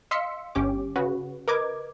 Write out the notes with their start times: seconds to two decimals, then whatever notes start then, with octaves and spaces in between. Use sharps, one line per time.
0.11 D#5 F5 C6 E6 B6 C#7
0.55 G1 C#4 G4 D6
0.96 C#3 F#4 B4
1.48 A#4 B4 D#5 D6 G#6